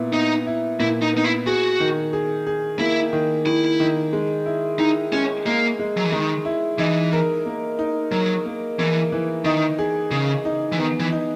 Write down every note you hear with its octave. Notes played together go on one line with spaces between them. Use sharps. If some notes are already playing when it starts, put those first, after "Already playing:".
Already playing: A#2 B3 E4
B3 D#4
E4
A#2 E4
D#4
B3 D#4
E4
F#4 G#4
D#3
G#4
G#4
A#3 E4
D#3
D#3 E4
D#3
G#3
E4
D#4 E4
G#3 C#4
G#3 A#3
G#3
F#3
E3
D#3 G#3
E4
E3 D#4
A#4
A#3
D#4
F#3 A#4
A#3
E3 A#3
E3
D#3 D#4
G#4
C#3 G#4
D#4
E3
D#3 B3
E3
D#4